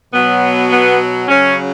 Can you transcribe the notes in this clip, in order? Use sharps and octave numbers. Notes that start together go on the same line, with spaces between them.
B2 F#3 B3
B3
C#3 F#3 C#4